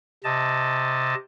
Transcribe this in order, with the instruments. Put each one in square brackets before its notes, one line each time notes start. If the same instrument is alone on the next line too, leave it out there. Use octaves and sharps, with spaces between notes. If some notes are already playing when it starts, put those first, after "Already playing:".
[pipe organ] C3 D#5 A5